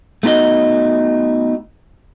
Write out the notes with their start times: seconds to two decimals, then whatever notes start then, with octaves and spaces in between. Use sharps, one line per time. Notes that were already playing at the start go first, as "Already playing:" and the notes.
0.23 A3 B3 D#4 F#4 D#5